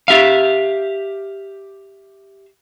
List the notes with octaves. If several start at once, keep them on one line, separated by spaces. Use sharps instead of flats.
G4 E5 F5